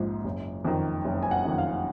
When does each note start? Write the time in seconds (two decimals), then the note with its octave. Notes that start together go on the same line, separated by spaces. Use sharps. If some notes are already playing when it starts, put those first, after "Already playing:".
Already playing: A#1 G#2 F3
0.24 F#1
0.65 F2 D#3
1.05 F#1
1.23 G#5
1.31 F#5
1.45 F2 D#3
1.58 F5